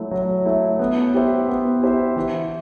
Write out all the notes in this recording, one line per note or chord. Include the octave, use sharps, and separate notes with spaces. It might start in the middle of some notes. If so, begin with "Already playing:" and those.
Already playing: F#3 A3 E4
F#3
A3 E4
B3
E4 G4 C5 E5
B3
E4 G4 C5 E5
E3